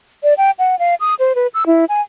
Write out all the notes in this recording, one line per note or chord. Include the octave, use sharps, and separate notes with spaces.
D5
G5
F#5
F5
D#6
C5
B4
E6
E4
G#5